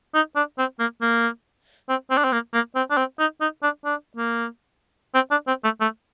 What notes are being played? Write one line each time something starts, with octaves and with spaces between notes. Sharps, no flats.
D#4
D4
C4
A#3
A#3
C4
C4
D4
C4
A#3
A#3
C4
D4
C4
D#4
D#4
D4
D4
A#3
C4
D4
C4
A3
A3